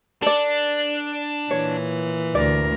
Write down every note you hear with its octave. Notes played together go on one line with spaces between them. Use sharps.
D4 A4 D5
A#2 E3 C#5
D2 A#4 D5